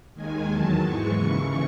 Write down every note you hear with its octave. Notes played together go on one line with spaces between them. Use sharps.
D#2 D#3 G#3 G#5
E2 D#3 F#3 A5
G#2 E3 G#3 C#6
D#2 C#3 E3